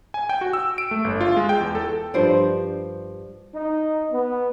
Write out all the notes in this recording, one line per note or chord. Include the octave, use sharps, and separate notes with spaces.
G#5
G5
F#4
E6
D7
A3
G1
F4
G#3
G5
E2
A4
G2 F3 C5 D5
D#4
B3